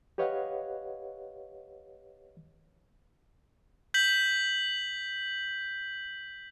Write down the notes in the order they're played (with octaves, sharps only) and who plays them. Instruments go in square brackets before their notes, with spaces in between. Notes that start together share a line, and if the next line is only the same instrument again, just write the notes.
[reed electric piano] G4 B4 C#5 D#5 F5 F#5
[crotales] G6 B6 F#7